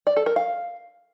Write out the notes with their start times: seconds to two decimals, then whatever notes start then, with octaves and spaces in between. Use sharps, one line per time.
0.07 D5
0.16 A4
0.26 A#4
0.36 F5